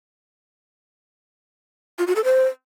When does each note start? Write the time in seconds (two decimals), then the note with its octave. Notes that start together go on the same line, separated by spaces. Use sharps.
1.99 F4
2.07 F#4
2.16 A4
2.24 C5